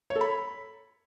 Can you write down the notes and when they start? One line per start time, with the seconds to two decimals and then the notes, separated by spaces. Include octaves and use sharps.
0.10 C#5
0.16 A4
0.21 B5